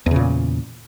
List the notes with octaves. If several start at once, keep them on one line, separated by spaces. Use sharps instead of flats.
E2 A#2 C#3